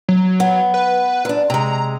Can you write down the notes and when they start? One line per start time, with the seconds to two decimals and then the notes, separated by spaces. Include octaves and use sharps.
0.09 F#3
0.40 B3
0.74 B4
1.25 F#2 D4
1.50 C3 G#3 A#5